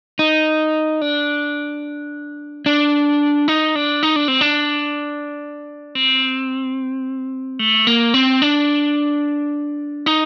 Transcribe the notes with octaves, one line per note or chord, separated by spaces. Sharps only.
D#4
D4
D4
D#4
D4
D#4
D4
C4
D4
C4
A3
A#3
C4
D4
D#4